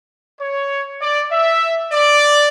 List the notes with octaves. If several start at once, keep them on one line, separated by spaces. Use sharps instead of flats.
C#5
D5
E5
D5